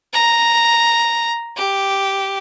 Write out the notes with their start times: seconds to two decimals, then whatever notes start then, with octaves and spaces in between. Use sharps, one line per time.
0.13 A#5
1.56 G4